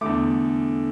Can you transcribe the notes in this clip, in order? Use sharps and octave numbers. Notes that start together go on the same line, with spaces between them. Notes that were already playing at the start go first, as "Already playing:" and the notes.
E2 D3 A3 D6